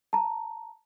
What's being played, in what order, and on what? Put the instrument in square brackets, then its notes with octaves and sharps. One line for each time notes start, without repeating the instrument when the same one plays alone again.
[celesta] A5 A#5